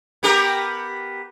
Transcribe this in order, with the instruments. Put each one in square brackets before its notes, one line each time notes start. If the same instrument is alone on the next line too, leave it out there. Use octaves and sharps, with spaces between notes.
[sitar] B3 G4 A#4